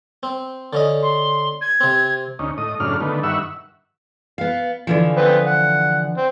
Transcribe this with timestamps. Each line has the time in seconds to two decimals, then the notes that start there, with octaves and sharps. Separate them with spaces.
0.23 C4
0.73 D3 C#4 D#5
1.03 C6
1.61 G#6
1.81 C3 C4
2.39 D2 C#4 D#4
2.58 A2 D#5 D#6
2.80 F#2 A2 C#3 D4 F6
3.01 D3 D#3 A3 B3
3.23 G2 D#3 E5 F#5 C#6 E6
4.38 B3 F5
4.87 D3 E3 F3
5.17 B3 C4 B4
5.47 F#5
6.17 C4